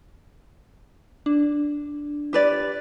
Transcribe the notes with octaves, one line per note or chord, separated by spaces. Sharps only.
D4
G4 B4 D5